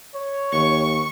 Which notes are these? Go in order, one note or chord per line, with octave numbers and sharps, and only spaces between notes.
C#5
D#2 C#6